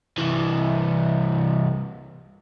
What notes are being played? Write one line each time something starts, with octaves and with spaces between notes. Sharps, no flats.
C2 E3